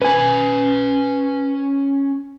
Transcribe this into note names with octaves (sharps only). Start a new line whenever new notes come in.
C#4 B4 G#5 B5